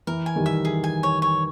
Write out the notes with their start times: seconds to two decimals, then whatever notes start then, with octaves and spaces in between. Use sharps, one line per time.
0.07 E3 A#4
0.26 G#5
0.36 D#3 G3
0.46 E5
0.65 G#4
0.84 G#5
1.03 C#5
1.22 C#5